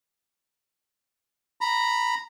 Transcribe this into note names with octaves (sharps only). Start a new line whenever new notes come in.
A#5 B5